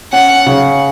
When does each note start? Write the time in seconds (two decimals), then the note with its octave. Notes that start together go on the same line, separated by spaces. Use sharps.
0.13 C#4 F#5
0.46 C#3